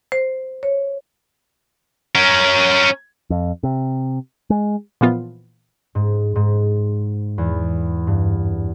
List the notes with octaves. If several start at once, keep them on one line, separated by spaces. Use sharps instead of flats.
C5
C#5
C#4 A#4
F2
C3
G#3
A#2 E3 F3 B3 F4
G#2
G#2
E2
G2